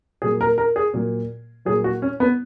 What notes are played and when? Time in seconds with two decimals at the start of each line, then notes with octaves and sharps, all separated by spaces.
0.22 A#2 F#3 A#3 G#4
0.41 A#4
0.58 A#4
0.76 G#4
0.94 A#2 F#3 A#3
1.65 A#2 F#3 A#3 G#4
1.84 F#4
2.02 C#4
2.20 B3